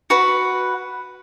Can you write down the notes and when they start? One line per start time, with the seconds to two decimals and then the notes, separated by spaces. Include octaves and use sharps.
0.10 F#4 B4 F#5